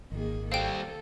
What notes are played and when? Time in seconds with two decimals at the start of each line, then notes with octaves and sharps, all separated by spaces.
0.12 G#1 D#3 A#3 G#4
0.52 G3 C4 A4 F5 G5